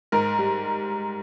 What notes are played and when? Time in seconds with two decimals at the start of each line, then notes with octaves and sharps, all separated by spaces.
0.12 G#2 A#4
0.39 G3